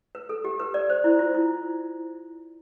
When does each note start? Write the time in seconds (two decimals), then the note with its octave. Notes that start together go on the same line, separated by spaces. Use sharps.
0.15 B4
0.29 A4
0.44 G4
0.60 B4
0.74 D5
0.90 C5
1.04 E4
1.19 F4
1.34 E4